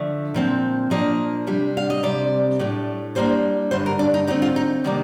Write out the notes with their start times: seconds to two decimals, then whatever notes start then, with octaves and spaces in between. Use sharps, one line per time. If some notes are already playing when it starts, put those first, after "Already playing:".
Already playing: D3 F3 A3
0.34 A#2 F3 C4
0.90 A#2 F3 A#3 D4 D#5
1.47 C3 G3 D4
1.77 F5
1.90 D#5
2.03 C3 G3 C4 D5
2.59 A2 A3 D4
3.15 D3 G3 A#3 D4 C5
3.71 G2 D3 A3 C5
3.86 A#4
3.99 D4
4.14 D#4
4.27 D3 A3 C4 D#4
4.42 F4
4.56 D#4
4.84 C3 D#3 G3 A#3 D4